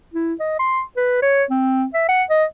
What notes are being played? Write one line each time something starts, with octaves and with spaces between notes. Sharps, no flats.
E4
D#5
C6
B4
C#5
C4
E5
F#5
D#5